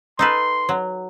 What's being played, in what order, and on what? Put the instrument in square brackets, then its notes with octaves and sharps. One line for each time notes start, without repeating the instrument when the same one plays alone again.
[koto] D#4 A4 B4 [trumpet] C6
[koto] F#3